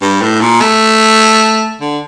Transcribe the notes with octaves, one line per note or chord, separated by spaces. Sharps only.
G2
A2
A#2
A3
D3